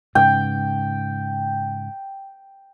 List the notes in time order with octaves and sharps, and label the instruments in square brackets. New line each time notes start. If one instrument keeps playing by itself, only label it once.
[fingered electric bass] G#2 C#3 [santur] G5